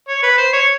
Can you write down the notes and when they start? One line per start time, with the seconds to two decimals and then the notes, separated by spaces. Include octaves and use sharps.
0.08 C#5
0.22 B4
0.38 C5
0.53 C#5